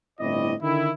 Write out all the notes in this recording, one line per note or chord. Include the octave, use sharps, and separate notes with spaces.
G1 A2 C4 E4 D5 D#5
D3 D#3 E4